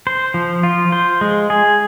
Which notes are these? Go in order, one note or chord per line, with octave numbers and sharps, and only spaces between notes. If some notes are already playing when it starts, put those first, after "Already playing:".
C5
F3
F4
C5
G#3
G#4